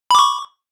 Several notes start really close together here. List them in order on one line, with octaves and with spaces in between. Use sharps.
B5 D6 C#6